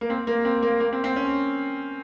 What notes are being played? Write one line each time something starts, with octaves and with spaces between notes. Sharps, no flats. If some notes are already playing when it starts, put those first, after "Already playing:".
A#3
C4
A#3
C4
A#3
A#3
C4
C4
C#4